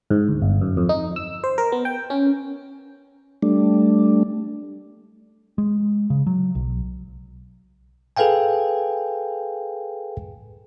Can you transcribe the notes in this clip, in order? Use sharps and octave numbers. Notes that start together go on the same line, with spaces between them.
G#2
D2
G1
F#2
F2
D#4
E6
C5
A#4
B3
G5
C#4
G3 A3 D4
G#3
C#3
F#3
B1
G#4 A4 B4 F5 G5 G#5